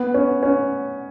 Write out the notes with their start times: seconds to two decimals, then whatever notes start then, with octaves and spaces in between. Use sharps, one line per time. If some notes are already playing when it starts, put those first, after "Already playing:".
Already playing: B3
0.14 C#4
0.43 C#4